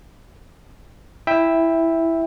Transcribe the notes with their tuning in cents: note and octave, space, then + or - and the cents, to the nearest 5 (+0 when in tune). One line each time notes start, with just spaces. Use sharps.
E4 +0 E5 +0 G5 +15